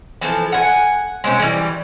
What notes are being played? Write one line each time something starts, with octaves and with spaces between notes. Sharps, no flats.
E3 F3 A4
F#5 G#5
G#3 C4 C#4
E3 G3